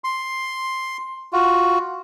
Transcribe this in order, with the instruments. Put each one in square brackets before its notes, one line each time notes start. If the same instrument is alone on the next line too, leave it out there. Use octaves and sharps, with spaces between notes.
[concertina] C6
F4 F#4